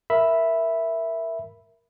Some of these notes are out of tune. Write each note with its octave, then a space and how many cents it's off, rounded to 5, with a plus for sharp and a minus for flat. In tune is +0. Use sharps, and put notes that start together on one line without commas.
A#4 +0 E5 +0 B5 +0